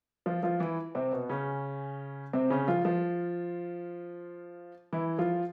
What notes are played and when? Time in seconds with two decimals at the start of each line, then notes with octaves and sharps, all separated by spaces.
0.26 F3 F4
0.43 F3 F4
0.60 E3 E4
0.95 C3 C4
1.12 B2 B3
1.29 C#3 C#4
2.33 C3 C4
2.50 C#3 C#4
2.68 F3 F4
2.85 F3 F4
4.93 E3 E4
5.18 F3 F4